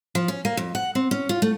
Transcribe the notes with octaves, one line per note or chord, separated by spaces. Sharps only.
F3
C#4
A#3
F2
F#5
C4
C#4
F4
A3